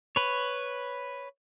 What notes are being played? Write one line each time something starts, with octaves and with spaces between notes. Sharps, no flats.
B4 C#5